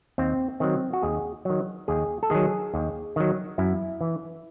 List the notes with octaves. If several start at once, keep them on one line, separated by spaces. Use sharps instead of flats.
D#2 C4
D#3 F#3 C4
F#4
D#2 G#4
D#3 F#3
D#2 G#4
A4
D#3 F#3 G#4
D#2
D#3 F#3
F#2 E4
E3